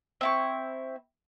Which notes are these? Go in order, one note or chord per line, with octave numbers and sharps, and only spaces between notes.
C4 E4 C#6